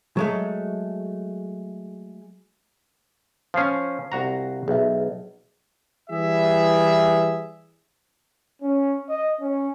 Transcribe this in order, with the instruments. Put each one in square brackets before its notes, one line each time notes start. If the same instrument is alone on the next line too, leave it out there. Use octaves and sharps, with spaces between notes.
[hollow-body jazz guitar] F#3 G#3 A3
[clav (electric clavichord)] F3 C#4 [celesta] F5 C7
[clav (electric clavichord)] C2 F#4 A#5
[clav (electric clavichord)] B1 [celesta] G#4 E5
[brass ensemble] E3 G3 G#4 E5
C#4
D#5
C#4